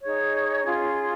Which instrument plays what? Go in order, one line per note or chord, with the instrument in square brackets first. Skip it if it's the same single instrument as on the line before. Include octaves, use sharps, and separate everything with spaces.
[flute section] D#4 G#4 C#5
C#4 F4 G#4